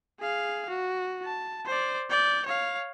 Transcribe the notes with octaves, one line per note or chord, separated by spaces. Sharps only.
G#4 F5
F#4
A5
C5 D5
D5 G6
C#5 F5